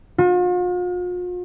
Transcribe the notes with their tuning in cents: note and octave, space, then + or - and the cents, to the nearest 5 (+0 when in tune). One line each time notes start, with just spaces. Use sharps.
F4 +45